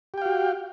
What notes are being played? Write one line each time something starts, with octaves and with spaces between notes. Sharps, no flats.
F#4 G4 F5 G5